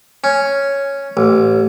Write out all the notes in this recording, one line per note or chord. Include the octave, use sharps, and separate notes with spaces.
C#4
A1